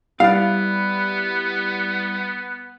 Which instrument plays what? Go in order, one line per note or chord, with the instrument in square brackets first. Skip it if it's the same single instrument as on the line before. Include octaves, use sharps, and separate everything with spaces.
[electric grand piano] G3 E4 [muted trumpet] B3 [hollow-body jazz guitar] D5 F5